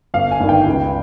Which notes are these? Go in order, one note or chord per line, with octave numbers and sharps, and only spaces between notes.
G1 F5
G#5
G2 D#3
G5
C#2